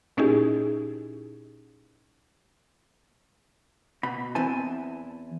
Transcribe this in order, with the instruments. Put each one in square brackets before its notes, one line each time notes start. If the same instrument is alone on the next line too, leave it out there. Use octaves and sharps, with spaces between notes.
[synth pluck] A#2 C#4 D#4 E4 G4 G#4
[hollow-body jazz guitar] B2 B5
E2 C4 E4 G#5 A5